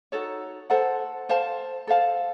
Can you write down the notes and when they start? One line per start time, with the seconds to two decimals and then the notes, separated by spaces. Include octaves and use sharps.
0.12 D#4 F#4 A4 C#5
0.70 A4 C5 F#5 A5
1.29 A4 C5 F5 A5
1.87 A4 C5 F5 A5